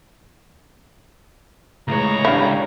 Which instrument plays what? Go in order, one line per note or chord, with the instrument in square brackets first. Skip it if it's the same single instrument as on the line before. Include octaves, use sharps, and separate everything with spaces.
[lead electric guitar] C#2 C#5 [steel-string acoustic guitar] A2 E3 G#3 [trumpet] A#5
[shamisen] D4 E4 [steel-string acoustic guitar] G4 F5 G5